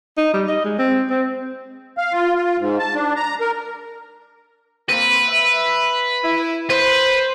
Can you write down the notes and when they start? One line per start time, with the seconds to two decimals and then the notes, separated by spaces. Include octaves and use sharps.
0.18 D#4
0.34 G3
0.48 D#5
0.64 G#3
0.79 C4
1.10 C4
1.97 F5
2.13 F4
2.36 F4
2.60 G#2
2.80 A5
2.95 D4
3.16 A#5
3.41 A#4
4.89 A#3 C4 B4
5.28 E5
6.23 E4
6.70 B4 C5